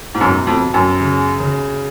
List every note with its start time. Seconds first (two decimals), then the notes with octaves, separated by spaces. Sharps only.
0.14 G#2
0.20 F#2 B2
0.47 F2
0.60 B2
0.74 F#2
1.00 C#3
1.40 C#3